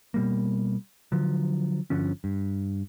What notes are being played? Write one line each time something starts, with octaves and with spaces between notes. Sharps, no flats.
B2 G3 A#3
D3 F3 F#3
G1 D3 F3 C#4
G2